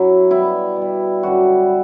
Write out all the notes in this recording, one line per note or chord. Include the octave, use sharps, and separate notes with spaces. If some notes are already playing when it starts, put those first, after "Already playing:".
Already playing: F#2 F#3 E4
B2 G3 E4
B2
G3
F#2 D3 G3 F#4